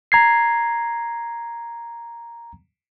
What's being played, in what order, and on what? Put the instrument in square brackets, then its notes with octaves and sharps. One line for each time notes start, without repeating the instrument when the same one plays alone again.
[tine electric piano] A#5 G#6 C7